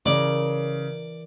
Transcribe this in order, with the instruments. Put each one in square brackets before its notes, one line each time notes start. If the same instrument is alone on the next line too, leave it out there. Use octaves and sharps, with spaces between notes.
[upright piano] C#3 [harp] E3 A#4 [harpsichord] D5